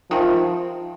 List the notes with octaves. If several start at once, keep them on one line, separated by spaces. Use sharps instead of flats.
C3 D#3 F3 G#3